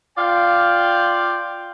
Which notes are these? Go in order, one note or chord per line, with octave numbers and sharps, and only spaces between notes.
F4 D5 F5 G5